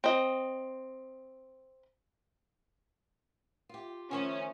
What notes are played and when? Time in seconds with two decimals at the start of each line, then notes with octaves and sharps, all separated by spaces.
0.04 C4 D#5
3.69 F4 G4
4.11 D#3 F3 A3 C#4